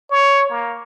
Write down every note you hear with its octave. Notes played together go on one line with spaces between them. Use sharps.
C#5
A#3